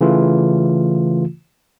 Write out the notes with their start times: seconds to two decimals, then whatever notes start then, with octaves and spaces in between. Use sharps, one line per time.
0.01 C#3 E3 A3 F4